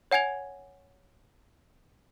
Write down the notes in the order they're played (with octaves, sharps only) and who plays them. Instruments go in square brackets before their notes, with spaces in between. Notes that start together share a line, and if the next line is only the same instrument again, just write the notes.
[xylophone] C#5 F#5 G#5 G#6 F7